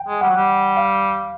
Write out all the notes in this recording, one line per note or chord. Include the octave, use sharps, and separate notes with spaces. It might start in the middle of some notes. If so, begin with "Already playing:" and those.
Already playing: G5
G#3
G3 F#5
F#3
G3
F5